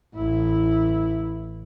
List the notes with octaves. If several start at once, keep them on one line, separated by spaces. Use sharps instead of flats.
A1 E4